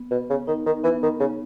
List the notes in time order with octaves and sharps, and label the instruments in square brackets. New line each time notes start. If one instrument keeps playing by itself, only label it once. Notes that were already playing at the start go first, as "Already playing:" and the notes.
Already playing: [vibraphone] B3
[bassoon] B2 [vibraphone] B3
[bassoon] C#3
[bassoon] D#3 [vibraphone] D#4
[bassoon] D#3
[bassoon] E3 [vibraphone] B3
[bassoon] D#3
[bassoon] C#3 [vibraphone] B3